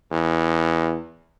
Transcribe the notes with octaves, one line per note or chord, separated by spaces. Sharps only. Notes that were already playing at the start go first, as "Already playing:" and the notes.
E2